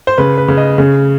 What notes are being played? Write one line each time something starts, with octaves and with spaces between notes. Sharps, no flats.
C5
C#3 B4
B4
C#3
D#5
C#3